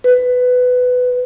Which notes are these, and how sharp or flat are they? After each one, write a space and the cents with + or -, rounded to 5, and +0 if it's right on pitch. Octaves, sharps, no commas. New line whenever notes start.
B4 +15